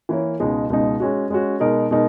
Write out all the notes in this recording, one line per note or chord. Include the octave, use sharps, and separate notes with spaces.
E3 A#3 E4 A#4 C#5
C#2 B2 G#3 D#4
C#2 B2 G#3 D#4
G#3 C#4 F#4
G#3 C#4 F#4
B2 G#3 D#4 A#4
B2 G#3 D#4 A#4